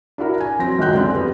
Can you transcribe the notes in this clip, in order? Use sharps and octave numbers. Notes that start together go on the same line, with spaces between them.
D4 E4 F#4 A#4
G#5
F#3 C4 A#6
C#2 F#2 D#3 F#4 F#6 G6
D3 C4 C#4
F2 G3 B3